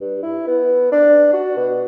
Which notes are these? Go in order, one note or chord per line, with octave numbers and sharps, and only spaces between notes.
G2
E4
B3
D4
F#4
B2